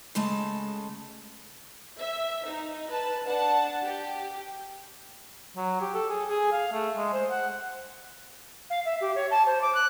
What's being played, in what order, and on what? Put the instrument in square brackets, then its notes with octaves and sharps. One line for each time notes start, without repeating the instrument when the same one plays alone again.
[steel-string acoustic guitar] C#3 G#3 A3 A5
[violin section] E5
D#4
B4 A5
D4 F#5 A5
G4
[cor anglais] F#3
G4
A4
G#4
G#4
F5
A3
G#3
C5
F#5
[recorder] F5
E5
G4
C#5
A5
C5
D6
F#6